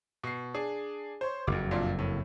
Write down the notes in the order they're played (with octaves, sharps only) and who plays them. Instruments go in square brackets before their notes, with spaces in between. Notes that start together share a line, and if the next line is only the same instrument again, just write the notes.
[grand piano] B2 C7
D4 G#4
C5 C#5
[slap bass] F#1 F2 [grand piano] D6
[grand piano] A#2 D4 F4
A2